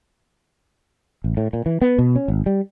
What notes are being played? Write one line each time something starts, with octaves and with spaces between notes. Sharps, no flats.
A1
A2
A#2
E3
B3
B2
C#4
G#1
G3